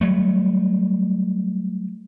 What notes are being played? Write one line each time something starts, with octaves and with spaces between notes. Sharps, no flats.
F#3 G3 A3